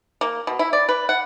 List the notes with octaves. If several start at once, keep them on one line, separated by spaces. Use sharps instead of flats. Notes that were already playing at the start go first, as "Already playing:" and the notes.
A#3
B2
E4
D5
B4
F#5